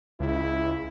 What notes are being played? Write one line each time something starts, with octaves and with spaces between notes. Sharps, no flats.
C#2 E4